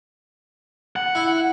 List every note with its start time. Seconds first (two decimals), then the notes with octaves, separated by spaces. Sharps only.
0.96 F#5
1.15 E4